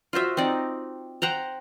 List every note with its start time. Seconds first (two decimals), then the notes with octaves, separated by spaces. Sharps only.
0.13 F4 F#4 C5 E5
0.37 C4 D#4 D5
1.22 C5 F#5 G5 A#5